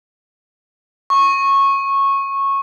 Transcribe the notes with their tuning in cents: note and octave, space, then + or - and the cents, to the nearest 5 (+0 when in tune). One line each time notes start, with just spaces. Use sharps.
C#6 -15